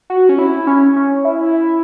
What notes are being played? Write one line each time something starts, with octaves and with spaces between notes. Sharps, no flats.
F#4
C#4
E4
C#4
C#4
E4